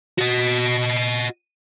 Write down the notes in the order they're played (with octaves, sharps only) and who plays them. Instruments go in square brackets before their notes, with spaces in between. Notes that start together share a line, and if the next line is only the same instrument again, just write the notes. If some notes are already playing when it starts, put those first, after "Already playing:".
[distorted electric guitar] F#4 D#5